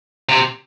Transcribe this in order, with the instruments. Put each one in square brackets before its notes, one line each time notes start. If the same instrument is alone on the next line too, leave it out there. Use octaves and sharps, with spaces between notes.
[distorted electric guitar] C3